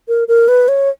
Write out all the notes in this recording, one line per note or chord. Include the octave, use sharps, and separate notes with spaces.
A#4
A#4
B4
C#5